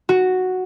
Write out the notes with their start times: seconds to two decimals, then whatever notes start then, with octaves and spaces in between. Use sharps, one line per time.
0.09 F#4